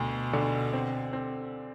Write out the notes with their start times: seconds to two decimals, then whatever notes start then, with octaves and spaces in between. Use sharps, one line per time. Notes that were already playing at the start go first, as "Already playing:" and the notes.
Already playing: D2 B2
0.33 D3
0.73 C4
1.13 C4